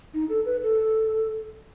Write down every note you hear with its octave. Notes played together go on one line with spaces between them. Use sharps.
D#4
A4
B4
A4